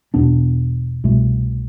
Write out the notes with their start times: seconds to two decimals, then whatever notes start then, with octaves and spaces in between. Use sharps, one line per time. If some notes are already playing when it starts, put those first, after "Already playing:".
0.14 E2 B2 B3 D4
1.04 C2 B2 A3